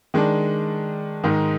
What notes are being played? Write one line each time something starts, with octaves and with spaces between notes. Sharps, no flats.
D#3 G#3 D4
G#2 D#3 G#3 D#4